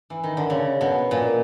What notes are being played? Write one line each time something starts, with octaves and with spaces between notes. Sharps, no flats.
E3
D#3
D3
C#3
B2
A#2